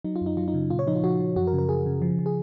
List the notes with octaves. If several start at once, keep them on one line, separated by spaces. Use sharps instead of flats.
F#3 D#4
F4
F#2
D#4
F#3 F4
D#4
C#3
A#2 F4
C#5
F3 D#4
F4
F3 F#4
F3
F#2 F#4
A#4
C#3
A#4
F#2 G#4
C#3
F3
F3
G#4